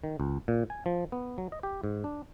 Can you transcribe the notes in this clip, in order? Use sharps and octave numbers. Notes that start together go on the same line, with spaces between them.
D#3
C#2
A#2
G#5
F3
B3
F#3
D#5
G4
G#2
D4